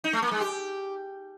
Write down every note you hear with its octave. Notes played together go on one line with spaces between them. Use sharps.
D#4
A3
A#3
G#3
G4